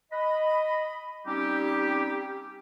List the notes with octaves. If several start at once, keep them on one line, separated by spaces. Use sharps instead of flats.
D#5 B5
G3 C4 C#4 D#4 G4